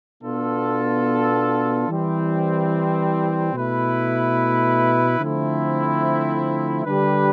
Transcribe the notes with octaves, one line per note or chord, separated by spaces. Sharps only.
B2 B3 D4 F4 A4
E3 G3 C4
B2 A3 E4 B4
D3 F3 A3 C4 E4
D3 G3 D4 G4 B4